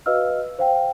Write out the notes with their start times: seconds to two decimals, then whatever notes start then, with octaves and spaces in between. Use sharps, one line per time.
0.06 F#4 B4 D#5 F5 E6 F6
0.59 C5 F5 G5